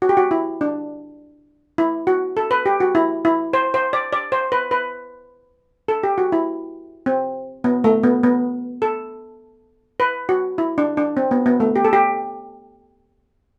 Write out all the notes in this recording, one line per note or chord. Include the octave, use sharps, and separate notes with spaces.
F#4
G4
F#4
E4
D4
E4
F#4
A4
B4
G4
F#4
E4
E4
C5
C5
D5
D5
C5
B4
B4
A4
G4
F#4
E4
C4
B3
A3
B3
B3
A4
B4
F#4
E4
D4
D4
C4
B3
B3
A3
G4
A4
G4